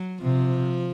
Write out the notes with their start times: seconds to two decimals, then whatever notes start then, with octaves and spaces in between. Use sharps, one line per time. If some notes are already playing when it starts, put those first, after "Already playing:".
Already playing: F#3
0.23 C3 F3